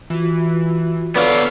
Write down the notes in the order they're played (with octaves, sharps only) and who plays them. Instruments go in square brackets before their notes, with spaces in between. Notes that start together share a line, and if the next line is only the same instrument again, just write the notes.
[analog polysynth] E3 [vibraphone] F4 F#4
[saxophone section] D3 A4 D5 [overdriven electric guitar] B3 F5 [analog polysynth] B4 C#5 E6